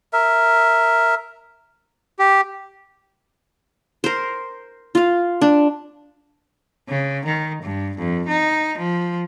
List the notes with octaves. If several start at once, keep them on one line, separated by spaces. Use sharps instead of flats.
A#4 E5
G4
A#4 C5
F4 F5
D4
C#3
D#3
G2
F2
D#4
F3